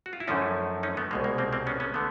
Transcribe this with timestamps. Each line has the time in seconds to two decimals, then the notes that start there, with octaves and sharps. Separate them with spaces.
0.06 F#4
0.13 F4
0.20 E4
0.28 F#2 D3 F3 A3 C#4 D#4
0.83 C#4 D#4
0.97 A3 B3
1.11 C2 B2 G#3 A#3
1.24 A#3
1.38 A#3 C4
1.53 A#3 C4
1.67 B3 C#4
1.80 B3 C#4
1.94 D3 A3 B3